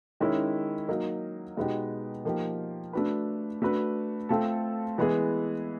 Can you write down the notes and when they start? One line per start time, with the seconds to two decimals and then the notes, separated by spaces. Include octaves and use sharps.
0.20 D#3 G#3 C#4 E4
0.89 F#3 A#3 D#4
1.57 B2 G#3 B3 D#4 G4
2.25 F3 A#3 D#4 G4
2.93 A3 D4 F#4 B4
3.62 A3 D4 F#4 B4
4.29 A3 C4 F4 A4
4.98 E3 G#3 B3 E4 G#4